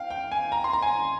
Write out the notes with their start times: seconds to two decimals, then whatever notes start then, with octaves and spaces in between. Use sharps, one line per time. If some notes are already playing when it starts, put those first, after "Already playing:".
Already playing: F5 G5
0.10 G5
0.32 G#5
0.52 A#5
0.64 C6
0.73 A#5
0.82 G#5